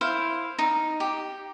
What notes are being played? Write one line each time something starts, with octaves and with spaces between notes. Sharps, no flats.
E4 C5 F5
D#4
G4